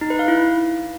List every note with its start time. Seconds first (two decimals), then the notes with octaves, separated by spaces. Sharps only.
0.01 D#4
0.10 B4
0.19 F5
0.28 E4